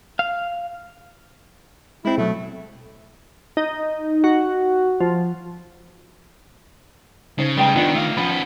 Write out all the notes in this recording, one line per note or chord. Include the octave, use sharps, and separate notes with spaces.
F5
G#3 C4 E4
B2 F#3 A3
D#4
F#4
F3
C#3 D#4 C5
G3 G#3 B4 G5 A#5
D#3 B3 D4 F4
A3 F5
F3 B3 C#4 B5